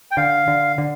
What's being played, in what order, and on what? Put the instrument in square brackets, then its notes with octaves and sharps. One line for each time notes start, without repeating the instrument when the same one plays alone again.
[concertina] G5
[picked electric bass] D3 [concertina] F5
[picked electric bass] D3
D3